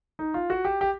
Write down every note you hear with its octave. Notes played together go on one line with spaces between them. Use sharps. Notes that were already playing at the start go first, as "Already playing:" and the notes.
D#4
F4
F#4
G4
G4